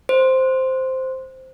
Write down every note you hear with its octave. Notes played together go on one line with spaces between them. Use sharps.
C5